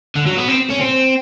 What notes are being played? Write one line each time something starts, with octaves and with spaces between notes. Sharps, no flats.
D3
F#3
B3
C4
C#4
C4